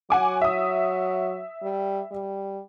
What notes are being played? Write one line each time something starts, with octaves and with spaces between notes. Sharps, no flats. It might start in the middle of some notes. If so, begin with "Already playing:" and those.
F#3 F#5 G#5 D6
E5 D#6
G3
G3